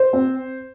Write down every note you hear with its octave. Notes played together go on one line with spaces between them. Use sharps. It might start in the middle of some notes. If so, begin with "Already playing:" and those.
Already playing: C5
C4